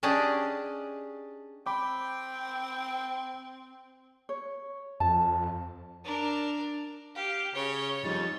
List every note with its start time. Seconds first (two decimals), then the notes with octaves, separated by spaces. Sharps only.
0.03 C#4 D4 G4 G#4 D5 D#5
1.66 C4 G5 B5 D6
4.29 C#5
5.00 F2 A5
6.05 D4 A#4
7.15 G4 F5
7.55 C#3 C#5 G7
8.04 F2 F3 G3 D#4 A6